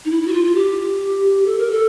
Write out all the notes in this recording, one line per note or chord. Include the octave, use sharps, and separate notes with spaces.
D#4
E4
E4
F#4
F4
F4
G4
A4
A#4
A4